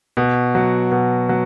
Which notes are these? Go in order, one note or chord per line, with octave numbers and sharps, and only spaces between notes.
B2
F#3
B2
F#3